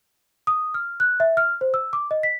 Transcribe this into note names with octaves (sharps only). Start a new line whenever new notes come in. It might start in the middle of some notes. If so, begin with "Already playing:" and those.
D#6
F6
F#6
E5
F6
C5
E6
D6
D#5
B6